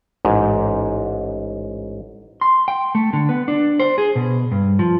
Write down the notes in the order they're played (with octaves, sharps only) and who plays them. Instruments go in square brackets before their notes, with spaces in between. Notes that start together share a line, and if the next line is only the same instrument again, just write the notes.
[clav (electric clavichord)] A1 G#2
[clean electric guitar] C6
G5
A3
D3
B3
D4
C5
G#4
B2
G2
F3